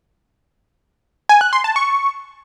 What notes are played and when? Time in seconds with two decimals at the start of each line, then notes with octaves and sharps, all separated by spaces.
1.29 G#5
1.41 F#6
1.53 C6
1.64 A5
1.76 C#6